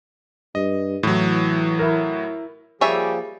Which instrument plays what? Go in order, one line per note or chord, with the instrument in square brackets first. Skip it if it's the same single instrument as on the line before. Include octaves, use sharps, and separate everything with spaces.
[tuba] G2 [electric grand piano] D#5
[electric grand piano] A2 F#3 [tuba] E3
[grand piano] E4 A#4
[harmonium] F3 A#3 G#4 [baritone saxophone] G3 [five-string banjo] C#5 E5 [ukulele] G#5